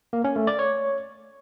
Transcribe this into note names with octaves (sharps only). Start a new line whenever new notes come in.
A#3
C#4
A3
D5
C#5